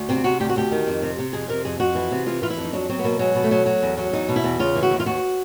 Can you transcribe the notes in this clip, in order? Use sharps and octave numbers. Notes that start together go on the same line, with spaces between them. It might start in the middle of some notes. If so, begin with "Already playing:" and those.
Already playing: D2
C3 C4
C3 F#4
D2 G4
F#4
D2 G4
D#3
F2
C3
C3
F2 G#4
C3 A#4
F2 G#4
F2 F#4
E3
C3
E3 F4
E3 F4
E4
F2
D#4
F#3 D4
F#3 C4
B3
B2 A#3
F#3 G#3
B2
A3
F#3
F#3
E2
F#3
E2 D#4
B2
E4
E2
C#3 F4
E3
F#4
D#2
F4
D#2 F#4